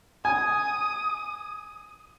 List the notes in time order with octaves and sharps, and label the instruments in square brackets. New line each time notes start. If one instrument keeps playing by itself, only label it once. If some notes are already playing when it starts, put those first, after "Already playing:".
[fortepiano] G#5 [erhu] D#6